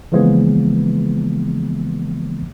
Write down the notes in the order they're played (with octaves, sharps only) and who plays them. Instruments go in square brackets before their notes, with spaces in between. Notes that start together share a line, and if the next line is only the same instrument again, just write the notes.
[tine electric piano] C#3 E3 F3 G#3 A#3 B3